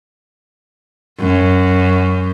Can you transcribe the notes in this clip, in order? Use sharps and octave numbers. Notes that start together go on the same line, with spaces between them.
F#2